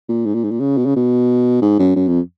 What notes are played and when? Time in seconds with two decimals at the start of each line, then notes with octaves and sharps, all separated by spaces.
0.09 A#2
0.26 G#2
0.34 A#2
0.44 G#2
0.51 A#2
0.60 C#3
0.77 B2
0.86 C#3
0.96 B2
1.62 G#2
1.79 F#2
1.96 F#2
2.08 F2